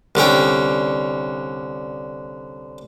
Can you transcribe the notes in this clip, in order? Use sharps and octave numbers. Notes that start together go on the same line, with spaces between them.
C2 D3 C#4 G5